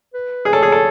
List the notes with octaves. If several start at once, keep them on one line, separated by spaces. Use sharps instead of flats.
B4
G#4
A4 C#5
G#4
A4